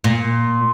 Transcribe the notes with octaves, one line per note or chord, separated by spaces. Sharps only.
A#2